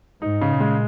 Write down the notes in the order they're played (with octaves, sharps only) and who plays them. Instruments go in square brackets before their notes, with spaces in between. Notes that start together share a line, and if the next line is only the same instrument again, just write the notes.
[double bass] G#2 [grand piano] D#4
[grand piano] C#3
[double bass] A#2
[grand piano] G#3